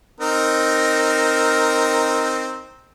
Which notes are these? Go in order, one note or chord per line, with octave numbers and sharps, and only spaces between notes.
C4 D#4 A#4